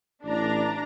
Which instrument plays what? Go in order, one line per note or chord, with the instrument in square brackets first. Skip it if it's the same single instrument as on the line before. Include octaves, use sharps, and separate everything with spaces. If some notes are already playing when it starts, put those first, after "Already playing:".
[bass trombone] A1 [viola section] D4 A#5